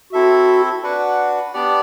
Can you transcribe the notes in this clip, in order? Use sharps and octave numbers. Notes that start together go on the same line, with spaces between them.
C4 E4 F#4 A4 E5
D4 F#4 B4 F#5
B3 D4 G4 D5 F#5